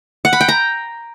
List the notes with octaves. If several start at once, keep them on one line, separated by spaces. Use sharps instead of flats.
F#5
B5
G5
A#5